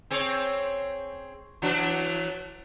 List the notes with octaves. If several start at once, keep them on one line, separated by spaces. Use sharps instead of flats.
C4 G#4 C#5
E3 F#3 D4